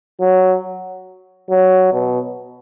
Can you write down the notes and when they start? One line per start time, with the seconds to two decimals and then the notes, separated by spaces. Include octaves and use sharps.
0.21 F#3
1.50 F#3
1.93 B2